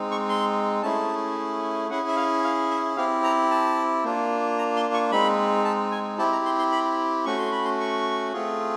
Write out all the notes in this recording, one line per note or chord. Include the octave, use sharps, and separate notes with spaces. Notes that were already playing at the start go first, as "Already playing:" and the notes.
Already playing: G#3 C4 D#4
C#6
C6
A3 C#4 E4 G#4 A5
C#4 E4 G#4 F#5
E5
F5
F5
E5
C4 E4 G4 F5
A#5
A5
A#3 D4 F4
A#5
C6
C#6
G#3 C4 D#4 B5
A5
G#5
C4 E4 G4 A5
A#5
C6
C6
B5
A3 C#4 F#4 C#6
C6
B5
C6
C#6
A3 C4 F4 G#4